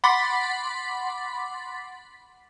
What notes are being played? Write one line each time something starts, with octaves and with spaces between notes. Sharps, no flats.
F#5 B5 C6 D6 A6 B6